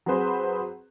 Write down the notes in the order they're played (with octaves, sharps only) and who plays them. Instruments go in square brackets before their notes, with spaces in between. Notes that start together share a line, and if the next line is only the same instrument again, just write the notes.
[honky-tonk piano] F#3 C4 G#4 B4 C5